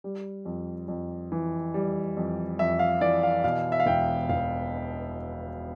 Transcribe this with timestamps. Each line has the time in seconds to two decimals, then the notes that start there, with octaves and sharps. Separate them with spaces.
0.04 G3
0.45 F2
0.88 F2
1.32 E3
1.74 G3
2.17 F2
2.59 F2 E5
2.79 F5
3.01 E3 D5
3.23 F5
3.44 B2 F5
3.72 E5
3.80 F5
3.86 E1 G5
4.29 E1 F5